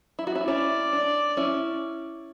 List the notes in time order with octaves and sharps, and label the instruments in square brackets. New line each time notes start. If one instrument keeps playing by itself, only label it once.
[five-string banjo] E4
F#4
C#4 E4
[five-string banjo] C#4 E4 [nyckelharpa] D5
[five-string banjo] D4
C#4 E4